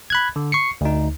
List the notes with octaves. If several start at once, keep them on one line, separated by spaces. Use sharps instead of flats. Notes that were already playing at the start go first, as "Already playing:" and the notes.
B5 F#6 G#6
D3
C#6 C7 C#7
D2 D#4